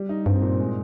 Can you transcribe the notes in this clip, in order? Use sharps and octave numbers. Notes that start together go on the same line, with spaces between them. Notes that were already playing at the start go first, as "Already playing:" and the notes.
Already playing: G3
D#4
G2 C4
A#2
G#3